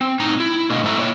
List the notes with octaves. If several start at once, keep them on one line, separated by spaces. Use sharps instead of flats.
C4
A2 D#4 A#5
E4
B2 D3 A3 D#5 F5
G#2 A3 D#4 E5 A#5
A#3 C#5 D5 E5